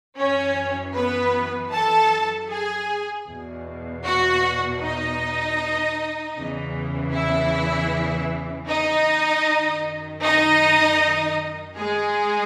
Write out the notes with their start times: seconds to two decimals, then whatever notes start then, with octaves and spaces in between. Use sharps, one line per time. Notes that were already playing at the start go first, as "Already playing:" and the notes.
0.17 F#2 E3 C#4 C#5
0.94 B3 B4
1.72 A4 A5
2.49 G#4 G#5
3.27 E2 B2
4.05 F#4 F#5
4.81 D#4 D#5
6.36 E2 C#3 E3
7.13 E4 E5
8.68 D#4 D#5
9.45 F#2 D#3
10.23 D#4 D#5
11.77 G#3 G#4